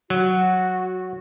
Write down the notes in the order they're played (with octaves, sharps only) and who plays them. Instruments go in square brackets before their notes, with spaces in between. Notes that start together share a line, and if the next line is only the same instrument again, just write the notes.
[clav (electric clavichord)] F#3 [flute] F#4